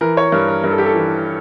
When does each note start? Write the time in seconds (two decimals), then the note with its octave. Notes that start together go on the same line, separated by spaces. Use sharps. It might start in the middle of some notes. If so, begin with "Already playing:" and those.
0.01 E3 A#4
0.17 C#5
0.32 G2 A#4
0.48 A#4
0.63 G2 A#4
0.71 A4
0.78 G4
0.86 A4
0.94 E3